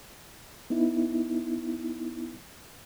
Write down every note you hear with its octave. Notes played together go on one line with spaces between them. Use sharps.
B3 D#4 E4